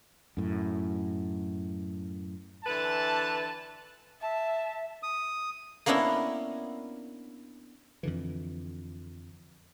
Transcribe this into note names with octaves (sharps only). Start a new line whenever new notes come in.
F#2 A2
D3 E3 B4 A5
E5 A5
D#6
A#3 B3 C#4 D4 E4 A#4
F2 D3 E3